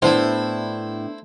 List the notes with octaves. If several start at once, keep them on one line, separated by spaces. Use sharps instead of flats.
A2 B3 D4 E4 C5